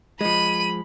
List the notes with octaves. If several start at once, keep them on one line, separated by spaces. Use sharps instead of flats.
F3 G#3 B5 D#7